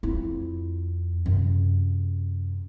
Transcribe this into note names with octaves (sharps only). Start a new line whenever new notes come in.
F2 E4
F#2 C3